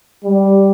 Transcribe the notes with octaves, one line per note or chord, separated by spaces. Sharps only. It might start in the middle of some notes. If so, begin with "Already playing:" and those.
G3